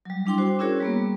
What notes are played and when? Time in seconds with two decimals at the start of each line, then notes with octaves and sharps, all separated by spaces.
0.05 F#3 G3
0.26 G3 D4 E4 G5 C6 D6
0.38 F#4 C5
0.59 C#4 E4 F#4 G#4 A#4 C#5
0.80 G3 A#3 B3